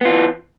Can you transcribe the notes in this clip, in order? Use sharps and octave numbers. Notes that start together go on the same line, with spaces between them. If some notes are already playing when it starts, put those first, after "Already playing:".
E3 B3 F4